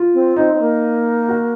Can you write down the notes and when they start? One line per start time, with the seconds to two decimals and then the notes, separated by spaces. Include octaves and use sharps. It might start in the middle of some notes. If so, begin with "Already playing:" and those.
Already playing: F4
0.14 C4
0.36 C4 D#4
0.54 C4
0.60 A#3
1.29 F#4